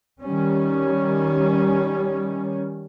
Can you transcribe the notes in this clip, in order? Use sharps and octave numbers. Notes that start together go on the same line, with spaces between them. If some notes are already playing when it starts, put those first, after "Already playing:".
D#3 G3 C#4